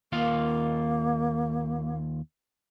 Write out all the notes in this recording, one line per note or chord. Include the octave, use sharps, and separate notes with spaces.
D#2 A#3 F4 F5